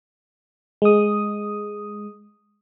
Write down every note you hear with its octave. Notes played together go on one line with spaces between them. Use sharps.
G#3 D#6